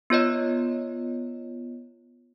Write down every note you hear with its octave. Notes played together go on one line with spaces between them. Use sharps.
B3 F4 C#5 D#5